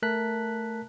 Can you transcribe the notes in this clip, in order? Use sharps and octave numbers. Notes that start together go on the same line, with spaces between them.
A3 A#4 A5 F#6 B6